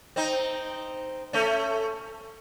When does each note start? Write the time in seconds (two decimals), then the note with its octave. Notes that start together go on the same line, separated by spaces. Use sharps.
0.16 C4 D#4
1.33 A3 C#4